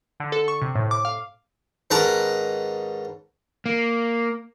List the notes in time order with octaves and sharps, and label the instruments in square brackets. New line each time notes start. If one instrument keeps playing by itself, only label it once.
[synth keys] D3
A4
C#6
C3
A2
D6
F5
[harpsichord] G#2 D#3 C#4 B4 A5 A#5
[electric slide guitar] A#3